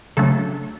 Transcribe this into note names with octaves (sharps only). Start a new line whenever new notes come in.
C#3 F#3 A3 D4 A4